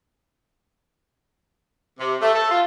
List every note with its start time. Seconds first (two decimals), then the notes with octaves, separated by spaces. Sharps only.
1.99 C3
2.21 A3
2.34 A4
2.50 F4